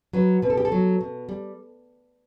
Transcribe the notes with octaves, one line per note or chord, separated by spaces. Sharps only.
F#3 B4
B2 B4
A4
G4
A4
F#3
B2
G3